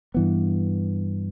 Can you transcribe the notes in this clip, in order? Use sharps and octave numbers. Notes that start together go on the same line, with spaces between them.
G2 E3 B3